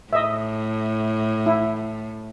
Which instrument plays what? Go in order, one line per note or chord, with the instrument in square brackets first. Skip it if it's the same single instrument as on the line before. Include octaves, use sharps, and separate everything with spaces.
[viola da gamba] A2 [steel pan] D#5 E5
[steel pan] E4